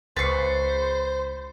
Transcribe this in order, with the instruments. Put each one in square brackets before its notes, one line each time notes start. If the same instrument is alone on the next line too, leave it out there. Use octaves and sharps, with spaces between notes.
[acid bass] C#2 [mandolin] B4 C#6 [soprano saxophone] C5 [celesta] A6 C7